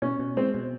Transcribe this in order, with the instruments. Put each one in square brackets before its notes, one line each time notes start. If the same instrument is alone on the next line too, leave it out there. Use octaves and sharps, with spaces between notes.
[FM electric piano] B2 [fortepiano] C#4
[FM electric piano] B2
[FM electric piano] G#3 [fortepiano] C4
[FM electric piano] B2